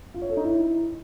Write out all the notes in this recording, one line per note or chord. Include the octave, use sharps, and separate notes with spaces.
F4
C#5
A4
D#4
E4